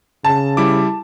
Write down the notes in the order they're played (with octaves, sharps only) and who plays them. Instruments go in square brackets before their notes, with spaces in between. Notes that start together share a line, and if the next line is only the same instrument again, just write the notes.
[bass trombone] C#3 [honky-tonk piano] A5
[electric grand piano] G3 E4 D6